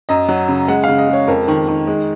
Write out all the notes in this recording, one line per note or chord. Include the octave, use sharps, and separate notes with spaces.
F#2 D#5
F#3
C#3
G#3 F#5
C#3 F5
D#5
G#3 C#5
F2 A#4
D#3
D#3
G#3